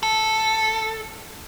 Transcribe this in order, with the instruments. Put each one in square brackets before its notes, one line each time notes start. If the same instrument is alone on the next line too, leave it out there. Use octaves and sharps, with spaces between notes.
[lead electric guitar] A4